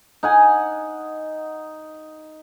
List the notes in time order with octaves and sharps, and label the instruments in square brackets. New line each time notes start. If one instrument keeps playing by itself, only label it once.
[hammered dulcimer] D#4 F#5 G#5